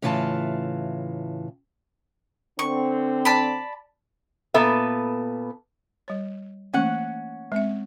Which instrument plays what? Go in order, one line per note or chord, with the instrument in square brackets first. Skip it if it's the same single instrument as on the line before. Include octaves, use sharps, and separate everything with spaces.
[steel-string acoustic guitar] A2 C#3 E3 F4 F5 A5
[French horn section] D3 C4 [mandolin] C#6
[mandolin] D5 A5 B5
[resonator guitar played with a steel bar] A#2 B3 A4 B4 E5
[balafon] G3 C#5
[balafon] E3 A3 A#3 [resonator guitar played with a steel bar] C#4 F#5
[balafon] G#3 C4 E5